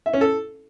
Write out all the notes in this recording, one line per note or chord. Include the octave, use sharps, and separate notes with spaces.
E5
C#4
A4